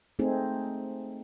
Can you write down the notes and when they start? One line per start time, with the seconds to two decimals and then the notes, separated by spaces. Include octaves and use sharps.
0.19 A3 C4 D#4 G#4